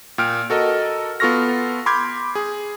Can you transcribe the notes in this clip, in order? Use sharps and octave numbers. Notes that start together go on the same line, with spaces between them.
A#2 G5 F6 D7
F#4 A4 A#4 D#5
B3 F4 A4 C#6 F6 A#6
B5 C6 D6 F6 G6 G#6
G#4